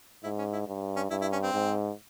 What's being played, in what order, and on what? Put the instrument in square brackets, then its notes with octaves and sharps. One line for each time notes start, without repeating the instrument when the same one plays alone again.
[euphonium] G#2 [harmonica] E4
[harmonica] C#4
E4
[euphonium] G2
[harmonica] C#4
[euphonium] G2 [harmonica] E4
[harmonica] E4
C#4
C4
[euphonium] G#2